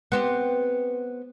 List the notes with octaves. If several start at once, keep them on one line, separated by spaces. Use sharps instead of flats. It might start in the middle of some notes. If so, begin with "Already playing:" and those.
B3 C4 G4